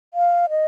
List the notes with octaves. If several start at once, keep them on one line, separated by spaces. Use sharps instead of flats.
F5
D#5